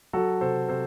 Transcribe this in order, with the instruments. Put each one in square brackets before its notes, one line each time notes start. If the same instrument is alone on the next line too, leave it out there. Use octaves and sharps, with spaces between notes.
[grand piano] F#3 F#4 A4
C3 A4 C5
C3 A4 C5